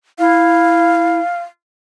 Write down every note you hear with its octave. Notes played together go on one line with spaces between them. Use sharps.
E4 F5